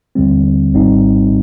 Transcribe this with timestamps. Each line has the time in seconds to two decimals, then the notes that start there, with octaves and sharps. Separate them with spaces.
0.15 D#2 D3 G3 C4
0.73 G#1 G#2 G3 C4 D#4